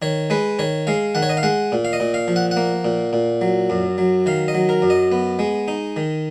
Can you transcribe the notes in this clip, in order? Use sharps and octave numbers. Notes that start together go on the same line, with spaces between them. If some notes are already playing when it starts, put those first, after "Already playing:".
D#3 C#5
G#3 B4
D#3 C#5
G#3 F5
D#3 F#5
C#5
D#5
F5
G#3 F#5
A#2
F5
D#5
A#2
F5
F3
F#5
F#5
A#3
A#2
A#2
F#3
F#2
F#3
D#3 F5
D#5
F#3
A#4
F#2
D#5
B3
G#3
D#4
D#3